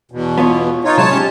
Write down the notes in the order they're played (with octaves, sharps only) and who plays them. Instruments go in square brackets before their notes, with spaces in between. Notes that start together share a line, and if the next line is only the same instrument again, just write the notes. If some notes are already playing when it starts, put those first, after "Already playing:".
[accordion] E2 B2
[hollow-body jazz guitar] B3 F4 C#5
[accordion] D#4 F4 C#5
[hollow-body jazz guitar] C3 F#3 G#3 [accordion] C#5 A5
[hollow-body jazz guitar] C#4 G4